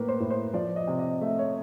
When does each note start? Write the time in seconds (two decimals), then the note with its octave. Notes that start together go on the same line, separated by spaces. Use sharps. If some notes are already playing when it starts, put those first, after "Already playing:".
Already playing: A2 A#3 A#4 B4
0.08 C5
0.20 A2
0.31 C5
0.53 F3 D5
0.76 D#5
0.87 C3
0.99 D#5
1.21 A3 E5
1.39 C#5